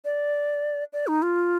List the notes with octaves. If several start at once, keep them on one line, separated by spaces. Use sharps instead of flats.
D5
D5
D#4
F4